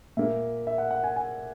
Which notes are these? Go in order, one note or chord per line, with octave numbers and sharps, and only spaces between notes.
A#2 A#3 E5
E5
F#5
F#5
G#5
G#5